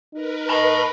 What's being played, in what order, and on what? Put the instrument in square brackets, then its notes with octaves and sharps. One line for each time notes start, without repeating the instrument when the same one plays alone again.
[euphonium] D#4 [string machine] A#4 B4
[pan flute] D#5 [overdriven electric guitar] A5 B5